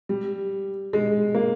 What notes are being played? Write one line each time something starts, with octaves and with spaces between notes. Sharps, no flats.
G3
G#3
A#3